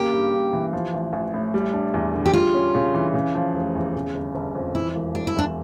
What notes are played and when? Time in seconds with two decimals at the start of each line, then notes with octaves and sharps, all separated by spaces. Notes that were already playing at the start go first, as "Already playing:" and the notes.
Already playing: C#3 A#3 G4
0.13 G2
0.34 G2
0.53 E3
0.73 F3
0.94 A1
1.13 A1
1.34 A2
1.54 G3
1.74 D4
1.94 E2
2.14 D3
2.26 G4
2.33 G3 F4
2.54 C#4
2.75 C#3
2.94 E3
3.14 C#3
3.35 F3
3.54 F1
3.75 E2
3.95 C#3
4.14 G1
4.35 G1
4.55 F2
4.75 E3 E4
4.95 E1
5.15 E1 D4
5.27 E4
5.36 E2 D4